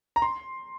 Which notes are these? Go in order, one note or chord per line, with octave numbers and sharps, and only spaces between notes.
A#5
C6